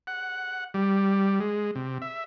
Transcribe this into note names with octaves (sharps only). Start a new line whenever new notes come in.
F#5
G3
G#3
C3
E5